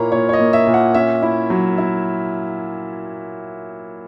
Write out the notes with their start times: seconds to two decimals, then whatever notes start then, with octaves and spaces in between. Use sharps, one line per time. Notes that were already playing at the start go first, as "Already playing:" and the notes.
Already playing: A#2 A#3 E4 C#5 A#5
0.12 A#2 C#5
0.29 C#5
0.33 D#5
0.39 A#3
0.53 E5
0.67 A#2
0.74 F#5
0.94 C#4 E5
1.23 E4
1.50 F#3
1.78 E4